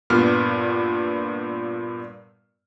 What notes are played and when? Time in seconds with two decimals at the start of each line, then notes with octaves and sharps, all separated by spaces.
0.10 G2 A#2 B3 F6